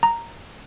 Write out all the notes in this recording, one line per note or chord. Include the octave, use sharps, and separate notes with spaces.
A#5